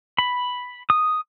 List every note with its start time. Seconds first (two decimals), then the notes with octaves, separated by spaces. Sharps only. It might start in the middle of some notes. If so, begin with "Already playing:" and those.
0.19 B5
0.90 D#6